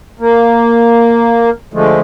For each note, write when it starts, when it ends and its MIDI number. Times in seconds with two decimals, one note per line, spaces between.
0.20 1.50 58
1.74 2.00 50
1.74 2.00 53
1.74 2.00 56
1.74 2.00 57